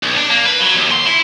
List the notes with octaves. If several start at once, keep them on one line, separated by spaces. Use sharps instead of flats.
B1
D4
A#3
B4
F#3
D#2
C6
E4